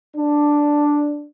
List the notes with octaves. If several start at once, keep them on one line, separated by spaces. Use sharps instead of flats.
D4